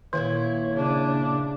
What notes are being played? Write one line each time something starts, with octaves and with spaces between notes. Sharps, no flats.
A#2 D#3 A#3 E4 C#5
C#3 D4